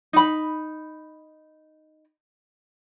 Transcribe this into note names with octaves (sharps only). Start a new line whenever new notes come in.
D#4 B5